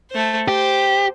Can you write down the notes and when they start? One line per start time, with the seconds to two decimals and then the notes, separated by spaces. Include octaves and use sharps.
0.11 A3 C5
0.48 G4 C5